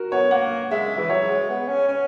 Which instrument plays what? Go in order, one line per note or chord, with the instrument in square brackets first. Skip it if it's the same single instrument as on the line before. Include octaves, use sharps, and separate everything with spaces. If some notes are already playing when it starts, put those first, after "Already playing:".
Already playing: [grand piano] F#4 A#4
[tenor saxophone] B3 [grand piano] C#5
[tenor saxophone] A#3 [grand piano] F#5
[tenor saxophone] G#3 [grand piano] E5
[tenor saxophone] E3
[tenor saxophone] F#3 [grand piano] C#5
[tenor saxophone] G#3
B3
C#4
C#4